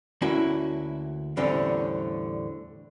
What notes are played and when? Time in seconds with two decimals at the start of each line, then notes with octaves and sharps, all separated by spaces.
0.22 D2 A#3 C#4 E4 F#4 B5
1.37 E2 A2 D3 G3 C4 C#4